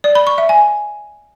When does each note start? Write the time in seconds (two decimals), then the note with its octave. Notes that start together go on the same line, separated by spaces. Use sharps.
0.04 D5
0.15 B5
0.27 C#6
0.38 E5
0.49 G#5